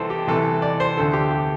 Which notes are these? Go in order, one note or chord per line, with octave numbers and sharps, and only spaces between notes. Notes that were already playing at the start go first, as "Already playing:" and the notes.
Already playing: C2 C3 E3 A4 C5
G4
C2 C3 E3 A4
D5
C5
D2 D3 A4
G4
G4